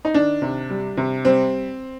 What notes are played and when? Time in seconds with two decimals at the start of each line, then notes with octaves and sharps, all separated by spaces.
0.05 D#4
0.14 D#3 D4
0.42 C3
0.70 G3
0.97 C3
1.25 G3 C4